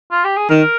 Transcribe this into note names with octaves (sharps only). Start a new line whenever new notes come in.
F4
G4
G#4
D#3 A#4